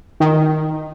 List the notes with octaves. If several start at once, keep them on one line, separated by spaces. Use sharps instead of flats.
D#3